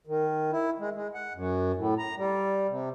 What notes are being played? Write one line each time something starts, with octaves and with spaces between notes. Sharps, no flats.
D#3
E4
G#3
G#3
F#5
F#2
A2
A#5
G3
C3